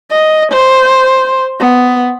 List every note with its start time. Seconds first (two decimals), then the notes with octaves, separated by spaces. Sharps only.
0.11 D#5
0.52 C5
1.60 B3